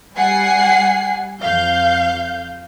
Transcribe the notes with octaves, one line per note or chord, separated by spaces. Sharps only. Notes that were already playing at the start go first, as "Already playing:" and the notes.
G3 F#5 G#5 C7
F2 F5 G6